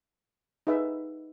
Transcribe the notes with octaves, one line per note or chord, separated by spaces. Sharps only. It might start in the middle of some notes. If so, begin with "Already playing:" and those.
D#4 G#4 B4 E5